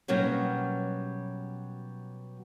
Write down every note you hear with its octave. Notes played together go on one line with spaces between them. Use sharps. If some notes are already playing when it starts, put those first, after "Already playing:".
B2 F#3 G3 A#3 B3 C#4